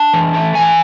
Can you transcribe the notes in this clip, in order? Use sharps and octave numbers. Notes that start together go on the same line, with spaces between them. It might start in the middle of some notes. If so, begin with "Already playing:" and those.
Already playing: D4 A5
E3
A3
E3 G#5